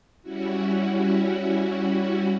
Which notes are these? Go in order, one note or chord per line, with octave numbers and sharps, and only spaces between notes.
G3 C#4 E4 F#4